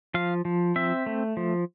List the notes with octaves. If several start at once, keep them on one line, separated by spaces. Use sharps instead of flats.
F3 F5
F3
C4 E5
A3
F3